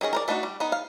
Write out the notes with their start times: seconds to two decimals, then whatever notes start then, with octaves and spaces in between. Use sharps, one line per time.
0.01 D#3 C#4 G#4 D#5
0.13 A#4 C5 D5
0.28 A3 D4 D#4 F4 F#4
0.43 G3
0.60 B3 D#4
0.72 F5